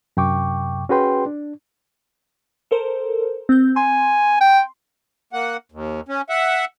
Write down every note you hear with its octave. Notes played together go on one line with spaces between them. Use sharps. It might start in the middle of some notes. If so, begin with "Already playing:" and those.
F#2 C3 G5 C#6 D6
C#4 F#4 G#4 B4 G5 C6
D4
A4 A#4 C5
C4 G6
G#5 C6
G5
A#3 F#5
D#2
C#4
E5 F#5